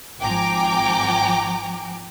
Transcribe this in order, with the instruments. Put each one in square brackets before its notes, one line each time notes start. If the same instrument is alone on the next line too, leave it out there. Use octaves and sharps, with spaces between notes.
[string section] G#1 F3 G5 G#5 A#5 D6